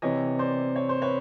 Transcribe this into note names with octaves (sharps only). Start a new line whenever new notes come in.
C3 E3 C#5 D#5
C5 D5
C#5
C5
B4 C#5